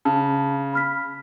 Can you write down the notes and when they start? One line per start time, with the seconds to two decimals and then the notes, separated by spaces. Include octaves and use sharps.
0.05 C#3 A5
0.73 B5 F6 B6